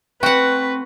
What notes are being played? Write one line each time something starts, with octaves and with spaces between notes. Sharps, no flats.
A3 C4 F#4 B4 F#5 G5